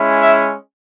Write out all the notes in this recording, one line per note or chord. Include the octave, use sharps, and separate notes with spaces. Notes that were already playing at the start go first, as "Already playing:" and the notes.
Already playing: G#3 C#4 E4
E5